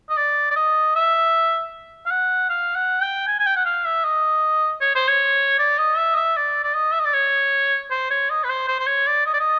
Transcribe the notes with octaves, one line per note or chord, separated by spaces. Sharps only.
D#5
D5
D5
D#5
E5
F5
F#5
F5
F#5
G5
G#5
G#5
G5
F#5
F5
E5
D#5
C#5
C5
C#5
D5
D#5
E5
D#5
E5
D5
D5
D#5
E5
D#5
D5
C#5
C5
C#5
D#5
B4
C5
C5
C5
C#5
D5
D#5
D5
D#5